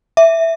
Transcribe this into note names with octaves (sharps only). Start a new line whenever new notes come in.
E5